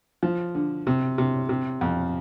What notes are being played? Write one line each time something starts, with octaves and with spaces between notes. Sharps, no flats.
F3
D3
C3
C3
C3
F2